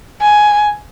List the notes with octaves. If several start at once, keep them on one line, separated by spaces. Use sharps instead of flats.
G#5